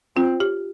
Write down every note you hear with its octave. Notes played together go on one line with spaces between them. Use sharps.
C4 F4
G4